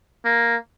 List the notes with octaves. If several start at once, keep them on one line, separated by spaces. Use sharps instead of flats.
A#3